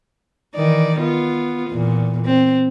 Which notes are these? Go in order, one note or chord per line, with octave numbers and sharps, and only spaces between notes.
D#3 E3 D5
B3 F4
E2 A#2
C4